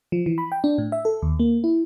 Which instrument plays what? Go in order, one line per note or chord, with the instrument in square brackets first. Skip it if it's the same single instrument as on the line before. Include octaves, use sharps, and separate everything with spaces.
[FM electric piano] F3
E3
B5
G5
D4
A2
E5
A4
D#2
A#3
E4